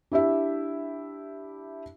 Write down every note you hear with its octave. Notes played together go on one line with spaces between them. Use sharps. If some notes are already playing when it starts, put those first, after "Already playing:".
D4 E4 G4 E5